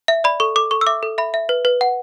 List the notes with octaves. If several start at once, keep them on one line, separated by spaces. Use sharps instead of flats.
E5
D5 B5
A4 C#6
A4 D6
A4 C#6
E6
E5 D6
A4
E5 B5
E5
B4
B4
F#5